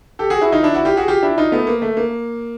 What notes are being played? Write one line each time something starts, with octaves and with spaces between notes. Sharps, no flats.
G4 A4
F#4 G#4
E4 F#4
D#4 F4
D4 E4
E4 F#4
F4 G4
F#4 G#4
F4 G4
D4 E4
D#4 F4
A3 B3
A#3
A3
A#3